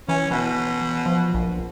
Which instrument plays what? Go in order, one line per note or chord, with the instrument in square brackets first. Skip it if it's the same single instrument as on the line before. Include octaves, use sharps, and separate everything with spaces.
[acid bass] E3 [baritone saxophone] C#4
[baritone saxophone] B2 [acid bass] E3
[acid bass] F3
A#1